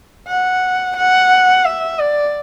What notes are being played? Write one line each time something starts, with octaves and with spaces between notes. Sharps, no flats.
F#5
F#5
E5
D5